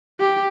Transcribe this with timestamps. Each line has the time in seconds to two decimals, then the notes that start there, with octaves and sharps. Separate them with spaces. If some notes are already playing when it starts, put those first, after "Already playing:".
0.20 G4